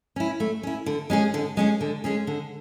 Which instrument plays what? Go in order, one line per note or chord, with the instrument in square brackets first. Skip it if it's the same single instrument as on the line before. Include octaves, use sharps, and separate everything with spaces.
[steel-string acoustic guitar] C#4 E4
A3
C#4 E4
D3
G#3 C#4 G#4
D3
G#3 C#4 G#4
D3
G#3 C#4 G#4
D3